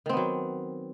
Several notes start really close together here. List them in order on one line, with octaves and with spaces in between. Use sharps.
D#3 C4 B3 F#3